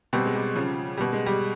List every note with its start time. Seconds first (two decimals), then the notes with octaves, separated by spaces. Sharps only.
0.13 B2 G3 C4
0.26 G#3
0.35 G3
0.56 C#3 F3
0.98 B2 G3
1.13 G#3
1.26 G3